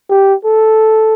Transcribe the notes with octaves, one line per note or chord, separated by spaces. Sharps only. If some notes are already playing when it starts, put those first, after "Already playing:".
G4
A4